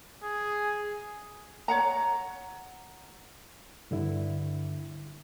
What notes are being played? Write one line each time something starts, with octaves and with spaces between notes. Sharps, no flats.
G#4
C#5 F#5 A#5
G2 D3 E4